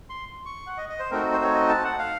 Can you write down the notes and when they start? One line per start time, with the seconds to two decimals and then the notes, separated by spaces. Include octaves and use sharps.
0.09 C6
0.46 C#6
0.67 F#5
0.78 D#5
0.89 D#5
0.99 C5
1.11 A3 C4 D#4 F#4 A#4
1.32 C5
1.43 C#5
1.54 D#5
1.69 A5
1.84 F#5
1.99 F5